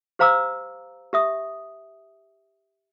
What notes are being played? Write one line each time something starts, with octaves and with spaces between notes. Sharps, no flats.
G4 C5 F5 A#5 D6 E6
G4 E5 D#6